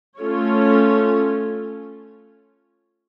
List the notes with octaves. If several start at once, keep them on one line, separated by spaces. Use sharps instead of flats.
A3 C#4 F4 A4 C#5